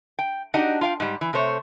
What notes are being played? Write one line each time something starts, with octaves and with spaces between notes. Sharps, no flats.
G5
D4 D#4 F#4 G4 D#5 F#5
F4 F5 G5
G#2 G3
E3
C3 A3 C5 C#5